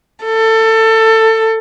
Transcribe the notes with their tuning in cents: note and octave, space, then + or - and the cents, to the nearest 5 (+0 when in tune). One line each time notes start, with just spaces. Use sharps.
A4 +20